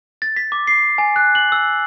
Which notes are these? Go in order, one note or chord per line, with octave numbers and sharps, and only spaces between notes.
A6
B6
D6
C7
G#5
F#6
F#7
E6